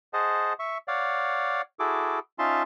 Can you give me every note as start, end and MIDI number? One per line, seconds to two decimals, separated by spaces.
0.13 0.53 68
0.13 0.53 72
0.13 0.53 75
0.13 0.53 78
0.13 0.53 81
0.59 0.78 76
0.59 0.78 85
0.88 1.62 73
0.88 1.62 74
0.88 1.62 77
0.88 1.62 78
1.80 2.19 64
1.80 2.19 66
1.80 2.19 68
1.80 2.19 69
1.80 2.19 86
2.39 2.63 61
2.39 2.63 63
2.39 2.63 65
2.39 2.63 76
2.39 2.63 81
2.39 2.63 84